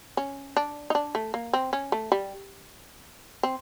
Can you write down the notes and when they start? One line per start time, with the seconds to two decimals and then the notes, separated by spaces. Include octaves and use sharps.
0.17 C#4
0.57 D4
0.90 D#4
0.95 D4
1.15 A3
1.34 A#3
1.53 C4
1.73 C#4
1.92 A3
2.12 G3
3.43 C4